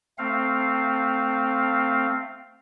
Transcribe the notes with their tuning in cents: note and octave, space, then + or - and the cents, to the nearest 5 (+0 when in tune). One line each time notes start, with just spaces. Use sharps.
A3 +20 C4 +0 F5 +0